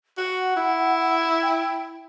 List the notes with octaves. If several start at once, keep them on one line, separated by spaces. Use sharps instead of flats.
F#4 F#5
E4
G5